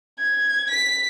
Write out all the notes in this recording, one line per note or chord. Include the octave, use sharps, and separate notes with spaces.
G#6
B6